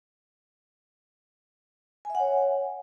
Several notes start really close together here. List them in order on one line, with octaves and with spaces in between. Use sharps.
G#5 E5 F#5 C#5